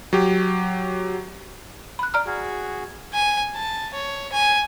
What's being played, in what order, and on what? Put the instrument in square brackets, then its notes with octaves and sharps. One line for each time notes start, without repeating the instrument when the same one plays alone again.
[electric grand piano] F#3 G4
[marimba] B5 F#6
D5 A#5 F6
[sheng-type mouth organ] F#4 G#4
[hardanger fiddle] G#5
A5
C#5
G#5